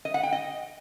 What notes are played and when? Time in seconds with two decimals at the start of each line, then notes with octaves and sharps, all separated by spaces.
0.05 D#5
0.14 F#5
0.23 G5
0.33 D#5